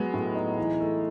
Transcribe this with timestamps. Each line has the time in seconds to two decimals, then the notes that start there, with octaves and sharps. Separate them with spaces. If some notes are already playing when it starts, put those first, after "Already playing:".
Already playing: F#3 G#3 B3
0.14 A2
0.35 D#4
0.58 E3
0.80 A3